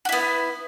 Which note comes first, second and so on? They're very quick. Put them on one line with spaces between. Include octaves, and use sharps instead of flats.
F#4 E4 B3